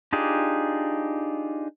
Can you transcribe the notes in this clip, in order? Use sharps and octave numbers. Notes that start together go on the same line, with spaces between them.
D4 D#4 F4 G4 G#4